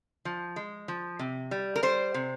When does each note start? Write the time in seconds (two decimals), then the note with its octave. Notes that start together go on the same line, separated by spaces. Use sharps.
0.25 F3
0.56 G#3
0.88 F3
1.19 C3
1.51 G3
1.76 A#4
1.83 G3 C5
2.14 C3